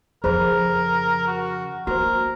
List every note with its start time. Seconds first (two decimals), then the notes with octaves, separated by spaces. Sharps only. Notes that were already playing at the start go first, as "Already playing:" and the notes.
0.24 F2 C#3 G#4 A#4 C5 B5
1.28 F#4
1.87 A#3 F#4 A#4 C5